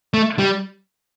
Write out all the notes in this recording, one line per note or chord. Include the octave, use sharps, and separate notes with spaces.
A3
G3